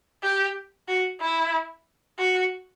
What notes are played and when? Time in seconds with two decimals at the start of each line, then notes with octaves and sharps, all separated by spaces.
0.23 G4
0.88 F#4
1.21 E4
2.18 F#4